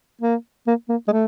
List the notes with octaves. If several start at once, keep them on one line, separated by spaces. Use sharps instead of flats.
A#3
A#3
A#3
G#3
A3